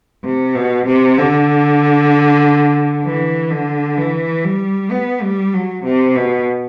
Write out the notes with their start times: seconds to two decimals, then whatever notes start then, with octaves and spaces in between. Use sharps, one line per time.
0.24 C3
0.55 B2
0.87 C3
1.18 D3
3.05 E3
3.51 D3
3.98 E3
4.45 G3
4.91 B3
5.22 G3
5.54 F#3
5.84 C3
6.15 B2